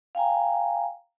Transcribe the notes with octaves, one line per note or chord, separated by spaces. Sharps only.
F5 G5 G#5 A#5